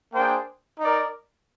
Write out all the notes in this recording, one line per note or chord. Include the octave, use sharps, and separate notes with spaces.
A#3 D4 G#4 C5 G5
D#4 A#4 D5